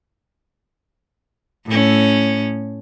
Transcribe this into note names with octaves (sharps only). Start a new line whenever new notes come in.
A2 C#4